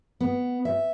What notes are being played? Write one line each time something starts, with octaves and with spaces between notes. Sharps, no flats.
B3
E5